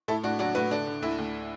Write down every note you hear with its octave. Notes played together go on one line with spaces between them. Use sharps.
A2 E4 A4
A2 D4 F#4
F#3 D4 F#4
A2 F#4 B4
D3 D4
D3
D2 E4
D2